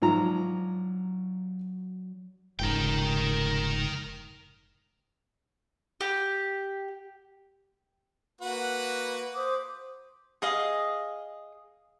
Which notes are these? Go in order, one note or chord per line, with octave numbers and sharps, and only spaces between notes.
G#2 F3 F#3 D4 A#5
F1 G#2 C#3 A#4 G5
G4
A#3 F#4 B4
C5 D6 D#6
G#4 D#5 F5